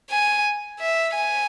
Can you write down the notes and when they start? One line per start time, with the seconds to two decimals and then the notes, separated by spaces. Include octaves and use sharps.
0.10 G#5
0.80 E5
1.15 G#5